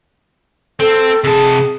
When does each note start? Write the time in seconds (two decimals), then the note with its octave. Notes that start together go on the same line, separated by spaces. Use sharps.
0.80 C4 A4
1.24 C3 G#4 A5